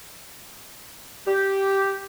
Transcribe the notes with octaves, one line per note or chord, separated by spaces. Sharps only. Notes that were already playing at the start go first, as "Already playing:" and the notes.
G4